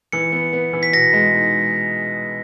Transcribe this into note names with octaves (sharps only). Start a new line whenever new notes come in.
E3 C#7
B3
B3
E3
B6
B2 A#6
G#3
D#4